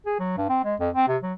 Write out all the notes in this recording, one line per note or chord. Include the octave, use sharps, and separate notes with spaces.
G#4
F#3
G2
C4
G#3
F2
C4
C3
F#3